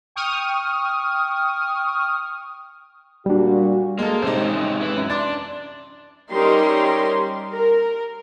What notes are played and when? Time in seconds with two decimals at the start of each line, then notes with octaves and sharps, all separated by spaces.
0.16 G5 C#6 D#6 F6
3.26 A#2 G3 D4 F#4
3.99 G#3 A#3 A4
4.22 A1 C3 G3 D#4 C5
4.37 G#3 C4 C#4
4.80 E4 B4
4.96 F#2
5.10 D4 C6 D6 A6
6.31 G3 C#4 D#4 G4 A#4 C6
7.50 A#4